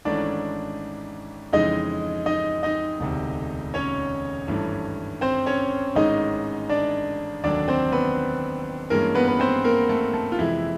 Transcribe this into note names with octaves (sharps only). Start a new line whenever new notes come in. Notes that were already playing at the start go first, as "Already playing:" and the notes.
G#1 G#2 E3 A3 C#4 D4 D5
F2 C#3 E3 G#3 D#4 D#5
D#4 D#5
D#4 D#5
E1 D2 C3
C#4 C#5
G#1 G2 E3 A3
C4 C5
C#4 C#5
A1 G#2 D#3 G#3 C#4 D#4 D#5
D4 D5
F1 D#2 D3 F#3 D4 D5
C4 C5
B3 B4
G2 E3 G#3 A#3 C#4 A#4
B3 B4
B4
C4 C5
A#3 A#4
A3 A4
A3 A4
F4
F2 C3 E3 G#3 E4